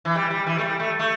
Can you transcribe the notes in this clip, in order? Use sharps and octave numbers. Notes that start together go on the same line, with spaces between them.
E3
G3
G3
E3
A3
G3
A3
A3